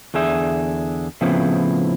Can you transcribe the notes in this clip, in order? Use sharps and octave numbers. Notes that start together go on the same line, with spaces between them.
E2 D3 G#4 E5
A2 C#3 F3 B3 C4 E4